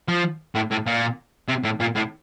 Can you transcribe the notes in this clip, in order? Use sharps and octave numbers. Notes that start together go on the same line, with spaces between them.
F3
A2
A2
A#2
C3
A2
A#2
A2